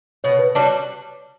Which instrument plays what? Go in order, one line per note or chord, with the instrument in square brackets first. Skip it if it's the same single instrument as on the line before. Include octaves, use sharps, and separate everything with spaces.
[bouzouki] B2 [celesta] C#5
[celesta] B4
[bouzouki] G3 D4 F#4 [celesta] C#5